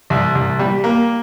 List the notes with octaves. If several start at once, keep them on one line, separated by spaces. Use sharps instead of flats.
C2
C2
G3
A#3